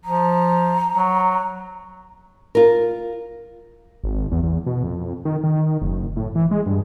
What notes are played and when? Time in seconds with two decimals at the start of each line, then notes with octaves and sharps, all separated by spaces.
0.05 F3 A#5
0.96 F#3
2.55 F4 A#4
4.03 G#1
4.32 E2
4.43 E2
4.66 B2
4.84 F2
5.25 D#3
5.44 D#3
5.81 F#1
6.17 A2
6.35 E3
6.51 G#3
6.66 G2